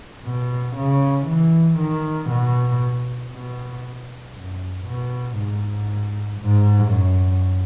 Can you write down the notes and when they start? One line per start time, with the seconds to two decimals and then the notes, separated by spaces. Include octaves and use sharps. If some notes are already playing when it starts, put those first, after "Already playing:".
0.25 B2
0.76 C#3
1.27 E3
1.79 D#3
2.30 B2
3.33 B2
4.35 F#2
4.86 B2
5.37 G#2
6.41 G#2
6.92 F#2